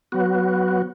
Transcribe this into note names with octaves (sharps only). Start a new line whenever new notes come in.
F#3 B3 F#4